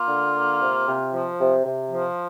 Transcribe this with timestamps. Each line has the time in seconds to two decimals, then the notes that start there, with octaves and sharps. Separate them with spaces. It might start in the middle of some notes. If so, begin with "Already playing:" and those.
Already playing: A#3 F4
0.08 D3
0.35 A#3
0.61 C3
0.87 C3
1.14 F3
1.40 C3
1.65 C3
1.91 F3